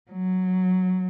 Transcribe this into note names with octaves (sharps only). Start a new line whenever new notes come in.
F#3